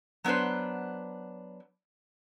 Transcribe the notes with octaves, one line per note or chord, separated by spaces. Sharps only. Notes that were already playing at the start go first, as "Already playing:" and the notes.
F#3 B3 D4 B4 C5